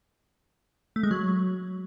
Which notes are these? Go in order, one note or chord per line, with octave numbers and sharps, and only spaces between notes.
A3
G#3
F#3